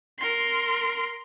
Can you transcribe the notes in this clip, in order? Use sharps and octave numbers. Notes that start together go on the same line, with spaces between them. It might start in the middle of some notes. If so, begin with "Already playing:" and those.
A#4 C6